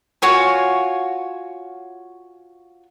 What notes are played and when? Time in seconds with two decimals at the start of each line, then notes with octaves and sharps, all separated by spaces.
0.22 F4 F#4 C#5 G#5